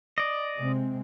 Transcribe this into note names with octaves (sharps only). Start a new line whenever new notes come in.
D5 D#5
C3 G#3 C4